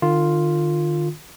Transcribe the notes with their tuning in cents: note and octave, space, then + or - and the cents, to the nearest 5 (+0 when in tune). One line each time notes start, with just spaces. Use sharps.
D#3 -45 F4 +0